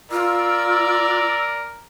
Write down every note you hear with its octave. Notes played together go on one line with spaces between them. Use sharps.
F4 A#4 D5 E6